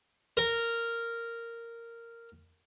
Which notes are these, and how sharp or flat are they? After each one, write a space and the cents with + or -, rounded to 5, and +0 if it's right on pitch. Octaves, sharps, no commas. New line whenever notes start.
A#4 -10